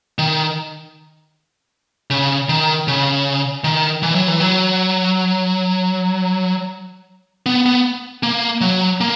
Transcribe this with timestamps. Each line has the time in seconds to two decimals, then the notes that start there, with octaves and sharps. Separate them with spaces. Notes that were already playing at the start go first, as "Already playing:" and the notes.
0.19 D#3
2.10 C#3
2.49 D#3
2.88 C#3
3.64 D#3
4.03 E3
4.15 F#3
4.28 E3
4.40 F#3
7.46 B3
7.66 B3
8.23 A#3
8.61 F#3
9.01 A#3